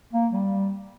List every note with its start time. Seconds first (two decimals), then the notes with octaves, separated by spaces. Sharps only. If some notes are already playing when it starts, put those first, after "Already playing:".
0.13 A#3
0.32 G3